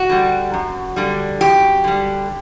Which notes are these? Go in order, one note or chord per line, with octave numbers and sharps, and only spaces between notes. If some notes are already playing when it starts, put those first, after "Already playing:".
Already playing: F#4
D3 G3
F#2
D3 G3
F#2 G4
D3 G3